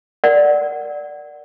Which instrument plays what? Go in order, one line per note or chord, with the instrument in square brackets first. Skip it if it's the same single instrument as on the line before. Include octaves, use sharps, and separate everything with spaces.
[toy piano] A#4 D5 F#5